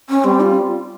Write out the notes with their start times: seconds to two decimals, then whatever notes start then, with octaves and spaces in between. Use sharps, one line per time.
0.10 C#4
0.24 G3 C4
0.40 F4